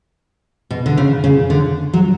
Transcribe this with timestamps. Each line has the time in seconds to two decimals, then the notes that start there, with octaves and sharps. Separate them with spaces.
0.71 B2
0.86 D3
0.97 C#3
1.24 C#3
1.50 D3
1.94 F#3